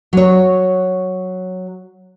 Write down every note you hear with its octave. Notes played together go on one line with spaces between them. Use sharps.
F#3 C#5